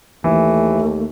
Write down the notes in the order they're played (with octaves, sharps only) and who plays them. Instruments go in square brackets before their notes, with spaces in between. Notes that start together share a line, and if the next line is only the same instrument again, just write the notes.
[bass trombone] D#2 [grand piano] E3 [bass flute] A3